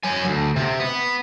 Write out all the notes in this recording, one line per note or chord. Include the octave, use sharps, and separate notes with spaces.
F#3 G#5
D2
C3
B3